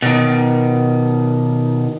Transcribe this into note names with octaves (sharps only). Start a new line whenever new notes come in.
B2 D#3